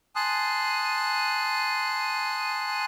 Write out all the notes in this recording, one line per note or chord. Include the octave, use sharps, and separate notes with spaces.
G#5 A5 C6 D#6 F#6